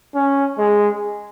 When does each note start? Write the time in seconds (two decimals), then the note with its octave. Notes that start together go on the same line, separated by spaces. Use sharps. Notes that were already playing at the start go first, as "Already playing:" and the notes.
0.14 C#4
0.58 G#3